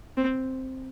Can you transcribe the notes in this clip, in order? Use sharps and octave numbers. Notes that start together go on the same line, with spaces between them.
C4